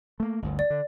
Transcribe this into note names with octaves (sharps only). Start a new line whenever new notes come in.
A3 A#3
G1 D2
D5
D3